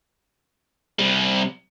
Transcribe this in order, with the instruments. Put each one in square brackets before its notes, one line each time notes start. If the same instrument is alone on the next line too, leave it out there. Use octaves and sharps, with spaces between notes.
[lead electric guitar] C3 G3